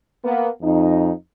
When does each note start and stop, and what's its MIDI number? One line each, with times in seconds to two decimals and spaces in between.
0.24 0.48 58
0.24 0.48 59
0.62 1.11 41
0.62 1.11 63